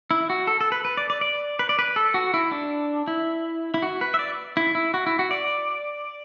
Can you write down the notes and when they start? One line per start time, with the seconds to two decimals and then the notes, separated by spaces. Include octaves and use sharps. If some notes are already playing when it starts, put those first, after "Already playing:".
0.11 E4
0.30 F#4
0.47 A4
0.61 A4
0.72 B4
0.85 B4
0.97 D5
1.10 D5
1.21 D5
1.59 B4
1.69 D5
1.79 B4
1.96 A4
2.14 F#4
2.34 E4
2.51 D4
3.08 E4
3.74 E4
3.82 F#4
4.01 B4
4.14 E5
4.19 D5
4.57 E4
4.75 E4
4.94 F#4
5.07 E4
5.19 F#4
5.31 D5